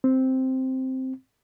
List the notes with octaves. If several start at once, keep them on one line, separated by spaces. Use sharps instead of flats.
C4